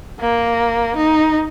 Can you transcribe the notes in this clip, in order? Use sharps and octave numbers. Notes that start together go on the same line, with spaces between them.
A#3
D#4